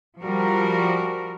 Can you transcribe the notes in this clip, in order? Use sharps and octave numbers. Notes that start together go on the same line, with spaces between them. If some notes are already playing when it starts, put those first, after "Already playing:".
F3 G3 F#4 A#4